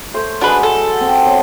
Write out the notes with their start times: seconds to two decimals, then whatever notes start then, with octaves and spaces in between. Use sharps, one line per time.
0.14 A3 C5
0.41 G#3 D4 F#4 B4
0.63 A4
1.01 C4
1.23 B3 C#5